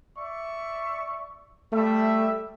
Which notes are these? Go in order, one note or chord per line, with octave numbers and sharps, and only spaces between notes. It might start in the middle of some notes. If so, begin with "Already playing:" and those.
D5 E5 C#6
G3 A3 E5